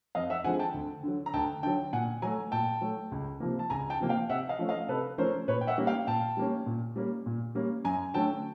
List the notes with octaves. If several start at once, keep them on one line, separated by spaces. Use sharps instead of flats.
F2 D#5 F5
E5 F#5
D3 F3 G#3 C4 F#5 G#5
G5 A5
D2
D3 F#3
A#5
D2 G5 A5
D3 F#3 G5 A5
A#2 F#5 G#5
F#3 A3 G#5 A#5
A#2 G5 A5
F#3 A3
C#2
C3 F3 A#3
A5
C#2 G#5 A#5
G5 A5
C3 F3 A#3
F5 G5
C3 E5 F#5
D#5 F5
F3 A3 C#4
D#5 F5
C3 A4 B4
F3 A3 C#4 A#4 C5
A#2 B4 C#5
G5
E5 F#5
G3 A#3 C#4
F5 G5
A#2 G5 A5
G3 A#3 C#4
A#2
G3 A#3 C#4
A#2
G3 A#3 C#4
F#2 G#5 A#5
D3 F#3 A3 C#4 G5 A5